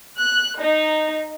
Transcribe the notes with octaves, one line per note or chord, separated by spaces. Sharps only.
F#6
D#4